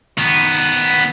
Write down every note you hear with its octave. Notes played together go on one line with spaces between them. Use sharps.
D#3 B3